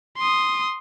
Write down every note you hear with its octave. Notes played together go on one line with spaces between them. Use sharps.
C6 D#6